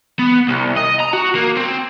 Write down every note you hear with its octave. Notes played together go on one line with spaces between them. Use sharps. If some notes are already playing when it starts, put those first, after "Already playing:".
B3
C2
D#5
A#5
F#4
A#3
C4